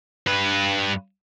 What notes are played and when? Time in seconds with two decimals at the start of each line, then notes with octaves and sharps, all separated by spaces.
0.27 G2 B4